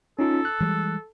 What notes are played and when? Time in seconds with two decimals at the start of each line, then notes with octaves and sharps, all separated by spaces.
0.19 C#4 D#4 F4 A4
0.45 F#6
0.61 E3 G3 G#3